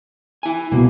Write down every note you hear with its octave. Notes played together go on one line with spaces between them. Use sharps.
E4 G#5
C2 B2 A#3